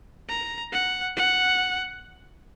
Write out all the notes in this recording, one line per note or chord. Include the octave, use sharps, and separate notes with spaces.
A#5
F#5
F#5